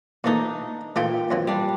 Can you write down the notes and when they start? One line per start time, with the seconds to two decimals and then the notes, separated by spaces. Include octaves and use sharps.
0.24 A#2 E3 A3 D4 D#4
0.96 A#2 E3 A3 F4 G5
1.31 F2 E3 F#3
1.47 G3 D4